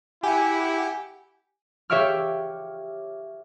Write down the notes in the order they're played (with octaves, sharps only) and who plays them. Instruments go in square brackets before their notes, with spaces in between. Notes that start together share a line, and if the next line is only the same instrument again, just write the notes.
[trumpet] E4 [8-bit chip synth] G4 [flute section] F#5 [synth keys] G#5
[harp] G4 C#5 E5 F5 D6 F6